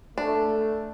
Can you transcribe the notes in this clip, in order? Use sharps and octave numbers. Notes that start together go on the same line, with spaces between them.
A3 D4